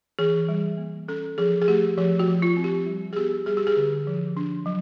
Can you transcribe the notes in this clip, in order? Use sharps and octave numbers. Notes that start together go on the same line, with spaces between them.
E3 G#4
G3
A#3
C#4 A4
F3 G#4
G#4
A3 G4
F3 G4
F#4
F3
F4
C4
G4
G3
G#4
B3 G4
G3 G#4
G4
G#4
D3
F3
D4
F#3